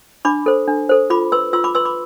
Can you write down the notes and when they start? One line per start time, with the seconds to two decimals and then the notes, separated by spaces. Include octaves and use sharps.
0.25 D4 B5 D6
0.46 A4 C5
0.68 D4
0.89 A4 C5
1.10 F4 B5 D6
1.32 B4 C6 E6
1.53 F4 C6 E6
1.64 B5 D6
1.75 B4 C6 E6
1.85 B5 D6